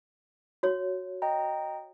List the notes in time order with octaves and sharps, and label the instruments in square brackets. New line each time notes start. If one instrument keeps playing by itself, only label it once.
[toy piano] F#4 C#5
[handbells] D#5 G5 A#5